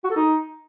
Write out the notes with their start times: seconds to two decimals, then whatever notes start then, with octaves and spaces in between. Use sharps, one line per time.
0.04 F#4
0.10 A4
0.16 D#4